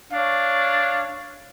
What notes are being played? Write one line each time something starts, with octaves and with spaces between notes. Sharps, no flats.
D4 C#5 F5